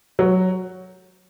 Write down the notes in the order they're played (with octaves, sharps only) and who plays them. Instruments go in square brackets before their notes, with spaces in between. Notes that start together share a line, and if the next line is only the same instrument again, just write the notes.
[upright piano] F#3